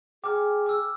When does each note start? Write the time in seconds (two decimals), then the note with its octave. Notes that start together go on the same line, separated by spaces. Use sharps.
0.24 G#4 G5 G#5 D6 F6
0.66 D6 E6